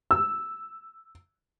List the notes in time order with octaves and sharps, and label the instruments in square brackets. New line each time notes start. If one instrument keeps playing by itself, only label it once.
[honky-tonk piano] E6